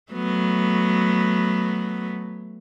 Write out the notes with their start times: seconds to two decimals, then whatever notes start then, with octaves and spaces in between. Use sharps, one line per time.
0.12 F#3 A3 B3